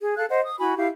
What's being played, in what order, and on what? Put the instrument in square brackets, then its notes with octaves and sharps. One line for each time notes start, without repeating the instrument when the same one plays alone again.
[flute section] G#4
A4 F5 F#6
C5 D#5 F#5
D#6
E4 F#4 G#5 B5
E4 G4 F5